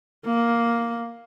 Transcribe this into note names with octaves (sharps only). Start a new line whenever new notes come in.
A#3